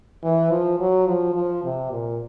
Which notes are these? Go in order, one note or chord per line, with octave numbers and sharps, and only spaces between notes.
E3
F3
F#3
F3
F3
C3
A#2